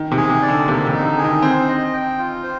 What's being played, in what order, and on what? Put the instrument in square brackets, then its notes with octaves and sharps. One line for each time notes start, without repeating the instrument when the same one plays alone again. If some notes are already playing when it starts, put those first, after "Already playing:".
Already playing: [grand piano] D#3
C3
[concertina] G#4
[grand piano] C3
[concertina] D5
[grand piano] D3
[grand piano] C3 [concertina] A#3
[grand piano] C3
[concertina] D#4
[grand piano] D3
[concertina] G#4
[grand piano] D#3
[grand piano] C4 [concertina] C5
[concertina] D#5
G5
F4
C5